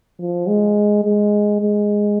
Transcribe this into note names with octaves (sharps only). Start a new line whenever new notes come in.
F3
G#3
G#3
G#3